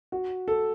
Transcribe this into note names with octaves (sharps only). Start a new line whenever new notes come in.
F#4
A4